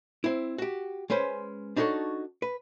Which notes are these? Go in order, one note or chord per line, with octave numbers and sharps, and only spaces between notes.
C4 E4
F#4 G4
G#3 C#4 B4 C5
D4 D#4 F#4 G4 A4 C#5
B4